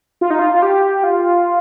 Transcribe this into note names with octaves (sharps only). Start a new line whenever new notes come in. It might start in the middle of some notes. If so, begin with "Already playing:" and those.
F4
D#4
F4
F4
G4
F4